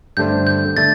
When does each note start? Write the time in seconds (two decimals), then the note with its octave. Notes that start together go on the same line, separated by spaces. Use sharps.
0.17 G2 D3 A3 D4 C5 G6
0.47 G6
0.77 D3 A3 A6